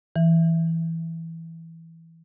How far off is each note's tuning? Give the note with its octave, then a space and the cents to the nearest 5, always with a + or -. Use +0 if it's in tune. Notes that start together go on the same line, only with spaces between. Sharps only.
E3 -5